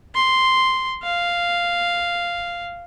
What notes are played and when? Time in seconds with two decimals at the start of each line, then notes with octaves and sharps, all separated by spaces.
0.15 C6
1.03 F5